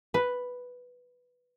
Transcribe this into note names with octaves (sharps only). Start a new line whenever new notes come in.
B4